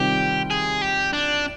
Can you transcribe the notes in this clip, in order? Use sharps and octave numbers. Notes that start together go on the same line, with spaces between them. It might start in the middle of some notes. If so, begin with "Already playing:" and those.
Already playing: C3 D#3 G3 C4 F4 G4
G#4
G4
D4